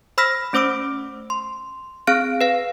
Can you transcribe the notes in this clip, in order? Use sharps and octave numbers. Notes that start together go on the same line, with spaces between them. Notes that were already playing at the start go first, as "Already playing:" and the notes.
C5 B5 E6 F6 A#6 B6
A3 C#4 C5 D6 E6 D7
C6
C4 G#4 F5 F6 F#6 D7
B4 F5